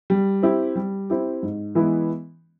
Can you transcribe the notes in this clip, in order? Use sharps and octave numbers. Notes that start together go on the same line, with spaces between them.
G3
C4 E4 G4
G3
C4 E4 G4
G#2
E3 G#3 B3 E4